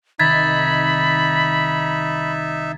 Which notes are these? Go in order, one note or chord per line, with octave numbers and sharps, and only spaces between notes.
C2 D#3 D#4 E5 B5 G#6 A6 B6